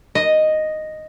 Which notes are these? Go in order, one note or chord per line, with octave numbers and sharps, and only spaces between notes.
D#5